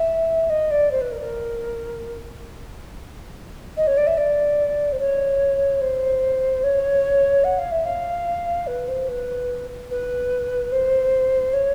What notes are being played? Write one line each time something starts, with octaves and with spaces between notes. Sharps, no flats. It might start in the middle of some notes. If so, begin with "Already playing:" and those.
Already playing: E5
D#5
D5
C5
B4
A#4
A#4
D#5
C#5
D5
E5
D5
C5
C#5
C5
C#5
F#5
F5
E5
F5
B4
C5
B4
B4
C5
C#5